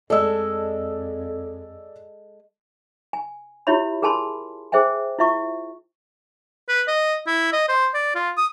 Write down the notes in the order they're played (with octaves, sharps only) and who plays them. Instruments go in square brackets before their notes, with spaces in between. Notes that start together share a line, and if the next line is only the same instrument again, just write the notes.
[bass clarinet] F2 [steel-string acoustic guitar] G#3 A4 [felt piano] D5 D#5 E6
[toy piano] G#5
E4 F4 G4 C#5 E5 B5
G#4 A#4 G#5 A5 B5 C6
G#4 C5 E5 G5 G#5
E4 F4 E5 C#6
[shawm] B4
D#5
E4
D#5
C5
D5
F4
D#6